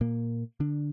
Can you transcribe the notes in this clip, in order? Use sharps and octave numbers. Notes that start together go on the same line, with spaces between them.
A#2 A#3
D3 D4